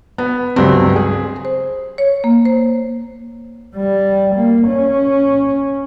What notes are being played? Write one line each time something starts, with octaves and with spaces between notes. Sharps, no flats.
B3
C#2 G2 F#3 C4
G#4
C5
C#5
A#3
C5
G3
A#3
C#4